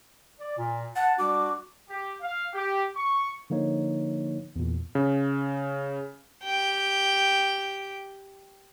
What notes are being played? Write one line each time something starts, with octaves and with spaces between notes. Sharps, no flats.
D5
A#2
F#5 A5
G3 D4 F#4 D6
G4
F5
G4
C#6
D3 F3 A#3 D#4 C#5
E2 A#2
C#3
G4 G5